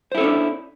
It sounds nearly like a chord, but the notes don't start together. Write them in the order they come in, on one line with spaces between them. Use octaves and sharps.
C5 E4 A4 C#4 D4